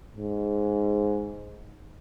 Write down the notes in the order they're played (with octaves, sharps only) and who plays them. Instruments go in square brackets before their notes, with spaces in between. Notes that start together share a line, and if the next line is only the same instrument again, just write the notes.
[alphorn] G#2